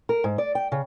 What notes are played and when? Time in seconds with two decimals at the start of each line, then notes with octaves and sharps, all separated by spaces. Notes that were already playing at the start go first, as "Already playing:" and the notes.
0.09 A#4
0.24 G#2
0.38 D5
0.55 G5
0.72 C#3